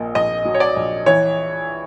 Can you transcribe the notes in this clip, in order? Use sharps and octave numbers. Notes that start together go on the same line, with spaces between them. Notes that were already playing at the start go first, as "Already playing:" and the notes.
Already playing: A#1 A#2 D#5
A#1 D#5
F#3
C#5
D5
A#1
E3 C#5